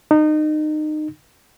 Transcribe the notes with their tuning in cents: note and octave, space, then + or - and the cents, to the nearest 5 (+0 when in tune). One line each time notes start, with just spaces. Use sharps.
D#4 -25